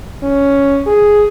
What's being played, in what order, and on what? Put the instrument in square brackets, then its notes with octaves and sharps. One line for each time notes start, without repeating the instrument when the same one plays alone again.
[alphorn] C#4
G#4